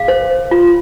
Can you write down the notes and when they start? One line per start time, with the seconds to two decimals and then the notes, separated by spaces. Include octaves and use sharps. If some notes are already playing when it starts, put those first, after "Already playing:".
Already playing: G#4 F5
0.08 C5
0.51 F4